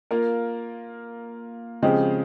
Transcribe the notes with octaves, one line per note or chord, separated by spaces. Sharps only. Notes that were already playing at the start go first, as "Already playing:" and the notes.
A#3 F4 A#4
C#3 F3 G#3 C4 G4